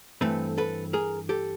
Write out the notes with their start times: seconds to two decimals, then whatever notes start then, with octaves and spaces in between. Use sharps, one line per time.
0.21 G2 E3 A3 C4 A4 B4
0.58 A4 B4
0.93 G#4 A#4
1.29 G4 A4